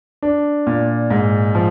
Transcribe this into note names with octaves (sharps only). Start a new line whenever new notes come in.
D4
A#2
G#2
F3